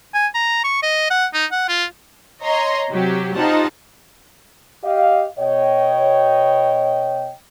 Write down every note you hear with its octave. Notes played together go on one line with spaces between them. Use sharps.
G#5
A#5
C#6
D#5
F#5
D#4
F#5
F4
C#5 D#5 A#5 C6
C3 F#3 G4
D#4 F4 G4 C5 F#5 A5
G4 D#5 F5
B2 C#5 D#5 G5